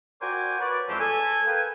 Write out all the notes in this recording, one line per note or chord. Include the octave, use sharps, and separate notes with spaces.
F#4 A#4 C5 D5 G5 G#5
B4 C#5 D5
F2 E3 G#3 A3 G4 C5
A4 G#5
A#4 B4 F5 G5 G#5